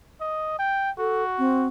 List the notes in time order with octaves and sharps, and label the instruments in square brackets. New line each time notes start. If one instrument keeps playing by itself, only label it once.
[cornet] D#5
G5
[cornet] F#4 [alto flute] A4
[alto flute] C4